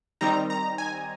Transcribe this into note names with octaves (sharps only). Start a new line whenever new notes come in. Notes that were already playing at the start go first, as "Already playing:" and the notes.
D#3 G3 C4 D#4 A#5
A#5
G#5